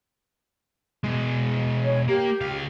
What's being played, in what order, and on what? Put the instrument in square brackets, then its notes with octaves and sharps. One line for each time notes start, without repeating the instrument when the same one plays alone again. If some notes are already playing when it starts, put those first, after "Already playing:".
[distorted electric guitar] B2 G#3
[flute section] C#5
[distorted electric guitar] A#3 [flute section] G4
[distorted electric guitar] C#2 F5